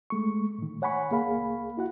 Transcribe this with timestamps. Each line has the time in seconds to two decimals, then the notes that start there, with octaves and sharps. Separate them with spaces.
0.10 G#3 A3 C#6
0.58 A2 D#3
0.82 C#5 F#5 G#5 B5 C#6
1.10 C2 A#3 G#4 F5 B5
1.77 E4 F#4 F#5